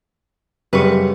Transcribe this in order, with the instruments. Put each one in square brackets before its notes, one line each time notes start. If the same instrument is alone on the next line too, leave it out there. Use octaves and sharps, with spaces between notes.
[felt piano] F#2 C#3 G3 [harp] B4 C#6